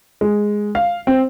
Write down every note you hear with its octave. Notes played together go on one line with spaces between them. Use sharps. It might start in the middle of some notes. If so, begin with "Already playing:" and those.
G#3
F5
C4